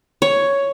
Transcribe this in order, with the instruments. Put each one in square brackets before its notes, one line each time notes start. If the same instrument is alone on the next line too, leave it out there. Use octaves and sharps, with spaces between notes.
[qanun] C#5